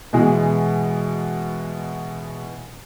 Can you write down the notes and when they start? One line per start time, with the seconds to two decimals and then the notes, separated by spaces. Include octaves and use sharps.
0.13 B2 E3 G#3